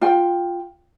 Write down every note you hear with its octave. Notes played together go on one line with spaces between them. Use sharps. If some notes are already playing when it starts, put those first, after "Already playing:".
F4 G5